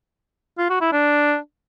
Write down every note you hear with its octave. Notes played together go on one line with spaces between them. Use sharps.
F4
F#4
E4
D4